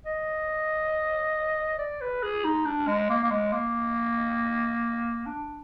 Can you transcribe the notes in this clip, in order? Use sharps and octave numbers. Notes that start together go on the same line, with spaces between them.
D#5
D5
B4
G#4
D#4
D4
G#3
A#3
A#3
G#3
A#3
D4